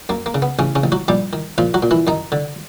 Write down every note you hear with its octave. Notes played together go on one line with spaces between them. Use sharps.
F#2 A#3
A#3
C#3
B3
A1 C#3 C#4
C#3 C#4
A1
F#3 F#4
A#1 G3 G4
D#3
A#2 F3 F4
F#3 F#4
A#2
E3 E4
F#2 D#3 D#4
D3